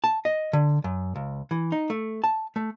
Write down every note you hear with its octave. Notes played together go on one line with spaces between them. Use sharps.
A5
D#5
D3
F#2
C#2
E3
D#4
A3
A5
A3